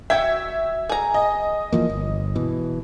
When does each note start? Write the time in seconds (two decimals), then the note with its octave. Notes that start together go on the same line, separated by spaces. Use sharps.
0.10 F#4 E5 G5 G#6
0.89 G#4 A#5
1.14 D#5
1.73 E3 F3 A#3
1.90 G1
2.36 B2 E3